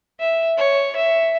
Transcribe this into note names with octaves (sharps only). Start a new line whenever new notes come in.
E5
C#5
E5